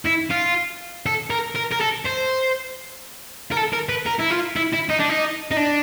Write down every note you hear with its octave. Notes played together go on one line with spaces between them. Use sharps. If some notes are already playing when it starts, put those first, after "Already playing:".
E4
F4
A4
A#4
A#4
A#4
A4
C5
A#4
A4
A#4
B4
A#4
E4
F4
E4
E4
D#4
D4
D#4
D#4
D4